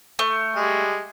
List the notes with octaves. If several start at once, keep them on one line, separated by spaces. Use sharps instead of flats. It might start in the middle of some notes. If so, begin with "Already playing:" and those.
A3
G3 G#3